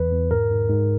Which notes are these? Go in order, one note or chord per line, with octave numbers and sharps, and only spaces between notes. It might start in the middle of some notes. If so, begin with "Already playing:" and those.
Already playing: E2 E3 B4
E2
G#2 A#4
G#2
G#2